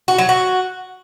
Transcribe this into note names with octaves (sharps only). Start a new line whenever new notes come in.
F#4
F#3
F#4